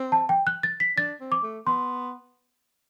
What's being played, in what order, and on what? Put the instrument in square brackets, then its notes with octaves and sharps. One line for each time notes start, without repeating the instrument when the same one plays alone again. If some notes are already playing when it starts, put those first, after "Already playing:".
Already playing: [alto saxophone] C4
[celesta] A5
G5
F#6
A6
B6
[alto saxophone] D4 [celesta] A6
[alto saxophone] C4
[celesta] D6
[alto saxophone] A3
[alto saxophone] B3 [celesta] C6